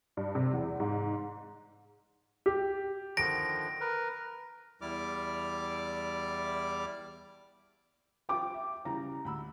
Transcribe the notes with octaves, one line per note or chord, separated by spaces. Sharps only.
G2
C3
E2
G#2
G4
D3 D#3 F3 A#6 D7
A#4 B4
E2 G3 E4 D5 D6 F6
F3 F4 G5 D6
E5
C#3 E3 G3 A#5
D2 B5 E6